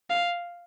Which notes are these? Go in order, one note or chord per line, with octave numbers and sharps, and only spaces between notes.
F5